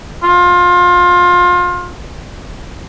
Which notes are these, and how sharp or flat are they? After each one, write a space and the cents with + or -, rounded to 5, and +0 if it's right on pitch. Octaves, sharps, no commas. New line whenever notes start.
F4 +25